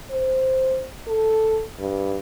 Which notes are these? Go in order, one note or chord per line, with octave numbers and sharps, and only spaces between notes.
C5
A4
G2